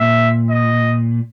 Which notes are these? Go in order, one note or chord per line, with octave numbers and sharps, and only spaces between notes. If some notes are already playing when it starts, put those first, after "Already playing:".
Already playing: A#2 E5
D#5